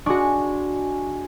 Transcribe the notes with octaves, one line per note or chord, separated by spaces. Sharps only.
G#3 D4 F#4 C#6